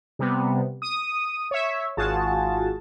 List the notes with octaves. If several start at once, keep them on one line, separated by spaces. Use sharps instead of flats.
C3 G3 B3
D#6
C#5 E5
G#1 F4 F#4 G#4 A5